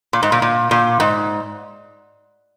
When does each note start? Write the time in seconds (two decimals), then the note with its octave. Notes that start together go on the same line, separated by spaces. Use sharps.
0.13 A#2
0.23 G#2
0.32 A#2
0.42 A#2
0.71 A#2
1.00 G#2